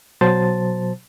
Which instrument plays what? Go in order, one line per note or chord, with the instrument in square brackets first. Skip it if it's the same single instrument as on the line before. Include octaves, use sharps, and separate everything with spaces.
[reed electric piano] B2 F#3 C5 A5 A6